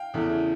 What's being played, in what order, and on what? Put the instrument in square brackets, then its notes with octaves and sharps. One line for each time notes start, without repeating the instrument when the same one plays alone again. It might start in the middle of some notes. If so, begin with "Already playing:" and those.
Already playing: [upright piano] F5 G5
E2 C#3 E3 A3